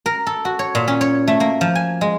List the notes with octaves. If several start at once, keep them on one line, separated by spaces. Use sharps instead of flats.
A#4
A4
F#4
C#5
A#2
C#4
C#5
A3
A#3
F3
G#5
G#3